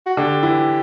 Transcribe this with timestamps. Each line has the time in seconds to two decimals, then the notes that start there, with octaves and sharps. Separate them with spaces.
0.06 F#4
0.17 D3 D4 G4
0.43 E3 E4